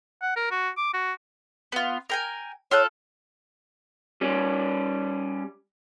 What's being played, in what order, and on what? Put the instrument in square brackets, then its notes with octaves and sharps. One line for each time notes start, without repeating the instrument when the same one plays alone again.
[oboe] F#5
A#4
F#4
D6
F#4
[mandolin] B3 F4
A#4 G5 G#5
[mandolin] F4 A4 F#6 [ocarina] C#5
[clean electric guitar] G3 C#4